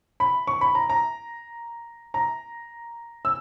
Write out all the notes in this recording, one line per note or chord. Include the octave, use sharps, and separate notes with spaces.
B5
C#6
B5
A#5
A#5
A#5
E6